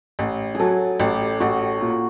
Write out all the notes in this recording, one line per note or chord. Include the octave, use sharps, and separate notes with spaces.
A1
F#3 G#4 A4
A1 G4
A1 F#4
A#2